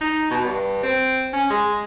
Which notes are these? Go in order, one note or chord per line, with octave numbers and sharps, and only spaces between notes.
D#4
B2
G2
C4
C#4
G#3